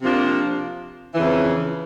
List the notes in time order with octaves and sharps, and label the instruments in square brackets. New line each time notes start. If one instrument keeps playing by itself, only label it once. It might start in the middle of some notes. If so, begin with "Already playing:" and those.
[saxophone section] C3 F3 A#3 D4 F4
F2 C#3 E3